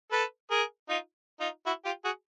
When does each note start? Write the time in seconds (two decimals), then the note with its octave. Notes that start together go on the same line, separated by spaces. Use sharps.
0.12 A4 B4
0.51 G#4 A#4
0.89 D#4 F4
1.40 D#4 F4
1.66 E4 F#4
1.85 F4 G4
2.04 F#4 G#4